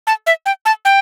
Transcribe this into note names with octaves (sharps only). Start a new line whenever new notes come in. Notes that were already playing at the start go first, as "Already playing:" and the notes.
A5
E5
G5
A5
G5